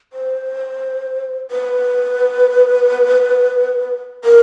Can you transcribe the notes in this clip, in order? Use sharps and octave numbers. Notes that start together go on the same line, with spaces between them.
C5
B4
A#4